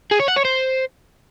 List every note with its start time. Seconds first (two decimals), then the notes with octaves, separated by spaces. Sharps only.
0.11 G#4
0.20 C#5
0.28 F#5
0.36 C#5
0.45 C5